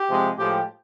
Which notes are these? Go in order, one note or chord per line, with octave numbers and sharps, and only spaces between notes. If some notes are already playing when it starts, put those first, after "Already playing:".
Already playing: G4
C3 F3 G#3
A2 F3 G#3 G4